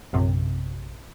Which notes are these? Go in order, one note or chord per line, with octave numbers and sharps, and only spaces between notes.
A#1 F#2 C3